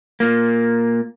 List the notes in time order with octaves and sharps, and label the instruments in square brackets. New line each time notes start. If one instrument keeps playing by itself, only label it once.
[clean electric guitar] A#2 A#3